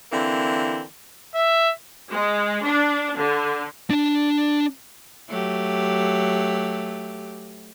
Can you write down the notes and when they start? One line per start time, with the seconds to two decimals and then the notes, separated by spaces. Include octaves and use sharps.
0.12 D3 E3 A#3 C4 E4
1.35 E5
2.10 G#3
2.62 D4
3.16 D3
3.90 D4 A5
5.29 F#3 A3 G4